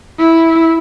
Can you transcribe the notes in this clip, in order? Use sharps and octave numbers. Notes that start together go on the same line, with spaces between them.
E4